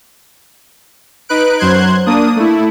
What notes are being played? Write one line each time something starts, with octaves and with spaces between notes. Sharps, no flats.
D#4 B4 F#6 D7
F#2 F#3 C5 C6 F#6 G#6
A#3 D4 D#6
A3 E4